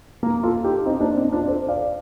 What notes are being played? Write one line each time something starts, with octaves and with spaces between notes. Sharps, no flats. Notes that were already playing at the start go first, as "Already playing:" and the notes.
A#3
F4 A4
D#4 G4
C4 D#4
A#3 D4
C4 D#4
D4 F4
A4 C5
D5 F5